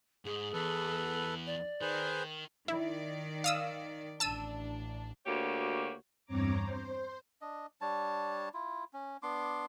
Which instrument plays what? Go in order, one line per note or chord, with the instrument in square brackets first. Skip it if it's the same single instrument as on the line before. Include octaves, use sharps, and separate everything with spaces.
[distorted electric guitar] G#2 [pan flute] G#4
[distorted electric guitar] E2 [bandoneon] A4 B4
[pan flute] D5
[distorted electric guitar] D#3 [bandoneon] G#4 B4 C5
[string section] D#3 D5 [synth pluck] E4
[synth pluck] F5 D#6 E6
[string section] A1 D4 [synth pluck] A5 E6 D#7
[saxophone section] D2 A#3 F#4 G4 C#5
[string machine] E2 G2 C4 C#5 A#5 D6
C5
[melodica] D4 D#5
G3 D4 C#5 A5
E4 F4
C#4
B3 D4 C6 D6